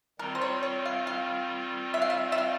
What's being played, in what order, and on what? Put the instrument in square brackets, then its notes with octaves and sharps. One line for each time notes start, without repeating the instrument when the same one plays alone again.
[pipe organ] D#3 G3 C4 F4 [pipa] A#4
[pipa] C5
C#5
C#5
F5
F5
E5
F5
E5
E5
F5